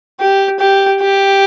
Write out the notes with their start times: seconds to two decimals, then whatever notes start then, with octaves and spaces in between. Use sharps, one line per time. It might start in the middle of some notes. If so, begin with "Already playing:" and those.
0.20 G4
0.60 G4
1.01 G4